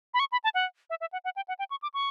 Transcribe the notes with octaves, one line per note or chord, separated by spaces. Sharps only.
B5
C#6
B5
A5
F#5
E5
E5
F#5
F#5
G5
F#5
G5
C#6
D6
C#6